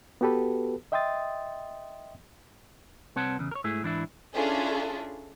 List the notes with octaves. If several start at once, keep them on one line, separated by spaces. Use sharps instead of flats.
B3 F#4 G4 A4 B4
D#5 E5 G5 C6 D#6 A6
C2 C4 B4 C#5 F#5 A5
E2 C#3
A#4 C#5
G#2 A3 E4 G#4
G#2 E3 D4 E4
C#4 D4 E4 F4 G#4 A4